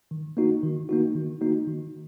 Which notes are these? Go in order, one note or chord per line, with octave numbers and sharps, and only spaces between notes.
D#3
A#3 D#4 F#4
D#3
A#3 D#4 F#4
D#3
A#3 D#4 F#4
D#3